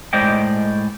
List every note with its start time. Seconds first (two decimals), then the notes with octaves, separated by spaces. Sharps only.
0.13 A2 G#3 C5 D5 D#5 G5